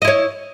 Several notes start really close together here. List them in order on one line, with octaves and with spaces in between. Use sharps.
D#5 E4 C#5